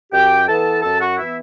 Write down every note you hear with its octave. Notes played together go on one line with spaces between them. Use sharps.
F#2 G4 G5
E3 B3 A4 A5
F#2 A4 A5
F#4 F#5
E3 B3 E4 E5